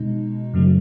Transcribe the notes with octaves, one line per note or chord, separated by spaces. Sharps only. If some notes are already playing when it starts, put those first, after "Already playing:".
Already playing: B2 G#3 D#4
F#2 C#3 F#3 A3